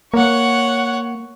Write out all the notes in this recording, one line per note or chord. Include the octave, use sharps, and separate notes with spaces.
A#3 C#5 F#5